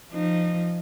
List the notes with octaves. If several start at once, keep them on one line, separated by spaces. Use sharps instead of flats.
F3 D#4